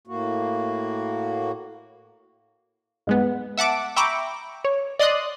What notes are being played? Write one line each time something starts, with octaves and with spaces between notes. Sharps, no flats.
A2 A#3 F#4
G#2 G#3 B3
E5 F#5 A5 D6
E5 G5 A#5 B5 C#6 D6
C#5
D5 D#5 C6 D#6 F#6